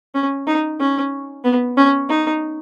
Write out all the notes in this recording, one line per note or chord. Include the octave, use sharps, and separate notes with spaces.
C#4
D#4
C#4
B3
C#4
D#4